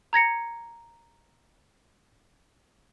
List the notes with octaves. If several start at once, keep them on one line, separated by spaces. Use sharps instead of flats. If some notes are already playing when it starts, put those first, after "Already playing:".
A#5 G#6 A#6 C#7